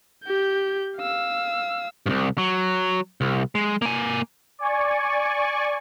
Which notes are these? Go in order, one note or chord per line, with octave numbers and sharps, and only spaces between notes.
G4 G6
F5 E6
C2 G2
F#3
C2
G#3
A#3 G#5
D5 G#5 C#6